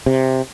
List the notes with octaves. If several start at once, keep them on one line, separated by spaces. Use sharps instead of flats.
C3